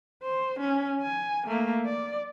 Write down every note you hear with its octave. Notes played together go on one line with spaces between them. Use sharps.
C5
C#4
G#5
A3 A#3
D5